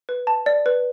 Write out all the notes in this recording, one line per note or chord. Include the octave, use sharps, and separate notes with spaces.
B4
A5
D5
B4